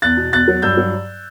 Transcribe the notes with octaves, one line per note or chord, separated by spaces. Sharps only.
E2 F#6 A6
B2
E2 F#6 A6
F#3
G2 E6 G6
F#3